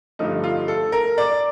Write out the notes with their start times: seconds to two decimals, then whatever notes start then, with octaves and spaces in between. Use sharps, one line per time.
0.19 G2 D3 F3 A3 D#4
0.44 F4
0.68 A4
0.92 A#4
1.18 D5